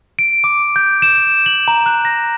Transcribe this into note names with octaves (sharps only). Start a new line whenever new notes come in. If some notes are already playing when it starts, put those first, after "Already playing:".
D7
D6
G6
E7
F#7
A#5
F#6
A#6